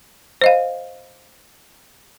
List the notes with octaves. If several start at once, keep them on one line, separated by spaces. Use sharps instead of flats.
C5 D#5 F5